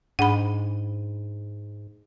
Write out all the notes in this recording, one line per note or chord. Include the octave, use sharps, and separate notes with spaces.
G#2 D4 G#4 F#5 B5